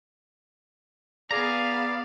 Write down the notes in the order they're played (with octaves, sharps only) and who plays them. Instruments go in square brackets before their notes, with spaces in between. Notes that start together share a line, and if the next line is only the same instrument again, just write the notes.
[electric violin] B3 F5 [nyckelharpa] G#4 [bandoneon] D5 [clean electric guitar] A#5